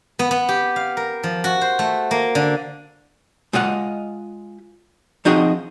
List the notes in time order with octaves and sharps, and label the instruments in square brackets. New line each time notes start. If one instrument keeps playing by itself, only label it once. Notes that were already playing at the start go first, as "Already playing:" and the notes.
[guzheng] B3
B3
G4
F5
A#4
F3
F#4
C5
A3
A#3
D3
[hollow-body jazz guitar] G#3 F4 D#5 F#5
F3 C4 D#4 F#4 G#4 D#5